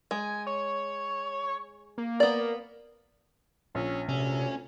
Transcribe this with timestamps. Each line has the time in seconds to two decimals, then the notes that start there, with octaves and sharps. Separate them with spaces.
0.11 G#3 G#5
0.47 C#5
1.98 A#3
2.20 B3 D5
3.75 A#1 C#4
4.09 D2 C3 C#4